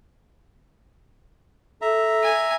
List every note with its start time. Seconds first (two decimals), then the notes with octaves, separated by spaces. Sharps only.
1.82 A4 E5 A#5
2.24 G#5